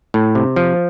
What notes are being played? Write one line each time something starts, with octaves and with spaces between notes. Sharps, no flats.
A2
C3
F3